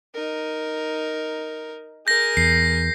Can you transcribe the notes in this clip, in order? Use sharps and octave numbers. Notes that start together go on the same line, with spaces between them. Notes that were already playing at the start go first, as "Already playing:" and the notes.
D#4 A#4
G#4 A#4 G6 A#6
E2 C7